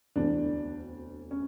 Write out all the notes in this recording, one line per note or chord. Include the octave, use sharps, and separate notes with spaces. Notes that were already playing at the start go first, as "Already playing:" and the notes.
E1 D2 C3 E3 D4
C#4